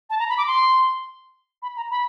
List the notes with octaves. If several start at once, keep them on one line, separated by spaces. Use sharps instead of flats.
A5
A#5
B5
D6
C6
B5
A#5
B5